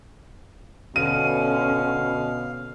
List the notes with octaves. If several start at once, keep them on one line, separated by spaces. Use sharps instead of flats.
B2 D3 C#4 F5 D#7